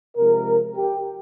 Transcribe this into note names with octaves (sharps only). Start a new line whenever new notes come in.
C3 F3 G#3 A#4
G4